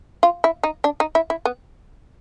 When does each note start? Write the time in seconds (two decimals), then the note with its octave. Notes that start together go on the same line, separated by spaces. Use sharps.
0.23 F4
0.44 E4
0.63 D#4
0.84 D4
1.00 D#4
1.15 E4
1.30 E4
1.45 B3